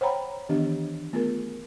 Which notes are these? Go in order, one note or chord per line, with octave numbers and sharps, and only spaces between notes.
C5 C#5 F#5 G5 A#5 B5
D#3 E3 B3 D4 G4 D#5
A3 B3 F4 G#4 A#4